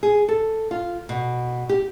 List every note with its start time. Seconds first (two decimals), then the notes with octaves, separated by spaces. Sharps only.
0.03 G#4
0.28 A4
0.71 F4
1.09 B2
1.69 G4